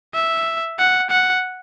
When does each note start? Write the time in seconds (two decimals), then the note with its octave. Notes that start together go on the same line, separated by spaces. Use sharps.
0.15 E5
0.79 F#5
1.10 F#5